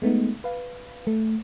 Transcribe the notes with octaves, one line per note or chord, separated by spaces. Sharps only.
G#3 A3 B3 D#4
B4 F5
A3